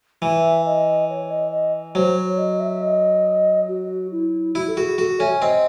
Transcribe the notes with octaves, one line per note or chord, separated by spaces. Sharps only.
E3 E5
D#5
C#5
D#5
D#5
F#3 C5
C#5
C#5
D#5
E5
D#5
F#4
E4
E4 F#4
A4
F#4 G#4
F#4 A4
C#4 E5
C4 D#5